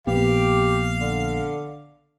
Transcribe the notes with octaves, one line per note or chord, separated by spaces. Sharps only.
A#1 B3 G4 F5
D3